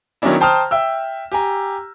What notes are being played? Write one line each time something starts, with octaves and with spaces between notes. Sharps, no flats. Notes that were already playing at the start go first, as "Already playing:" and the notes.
D#3 F#3 B3 C#4 D4 E4
C5 G5 A5 A#5 D#6 F6
E5 G5 E6
G4 G#5 A#5